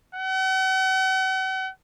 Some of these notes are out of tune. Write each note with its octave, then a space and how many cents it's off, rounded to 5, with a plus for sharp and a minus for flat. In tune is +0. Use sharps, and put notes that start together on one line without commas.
F#5 +40